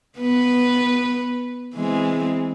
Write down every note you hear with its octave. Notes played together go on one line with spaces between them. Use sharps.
B3 B4
E3 G#3 C4